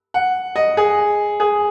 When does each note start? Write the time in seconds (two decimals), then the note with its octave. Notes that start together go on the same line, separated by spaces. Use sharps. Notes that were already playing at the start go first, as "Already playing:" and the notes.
0.14 F#5
0.56 D#5
0.77 G#4
1.40 G#4